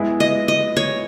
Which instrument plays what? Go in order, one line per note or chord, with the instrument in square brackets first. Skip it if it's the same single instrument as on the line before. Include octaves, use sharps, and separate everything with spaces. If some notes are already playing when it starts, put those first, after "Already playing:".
Already playing: [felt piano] G#3 B3 E4 B4
[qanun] D#5
D#5
C#5